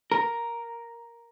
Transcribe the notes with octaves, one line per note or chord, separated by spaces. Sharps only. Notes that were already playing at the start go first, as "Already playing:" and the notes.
A#4